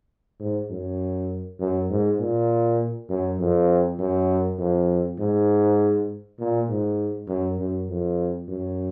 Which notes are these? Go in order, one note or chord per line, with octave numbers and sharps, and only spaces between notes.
G#2
F#2
F#2
G#2
A#2
F#2
F2
F#2
F2
G#2
A#2
G#2
F#2
F#2
F2
F#2